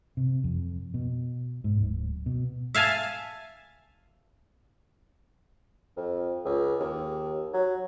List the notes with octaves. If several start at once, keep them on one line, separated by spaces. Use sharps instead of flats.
C3
F2
B2
G#2
D1
B2
E5 F5 G#5 A5
F2
C#2
D#2
F#3